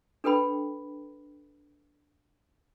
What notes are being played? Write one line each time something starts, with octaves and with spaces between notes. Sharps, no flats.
D4 A4 B4 G5 B5